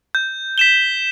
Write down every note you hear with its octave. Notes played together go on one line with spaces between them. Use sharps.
G6
B6 E7 G7